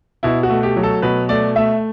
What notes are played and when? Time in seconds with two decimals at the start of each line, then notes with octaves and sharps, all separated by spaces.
0.23 B2 E4
0.43 F#4
0.50 A3
0.63 G4
0.77 F#3
0.83 A4
1.02 B2 B4
1.29 A3 D5
1.56 A3 E5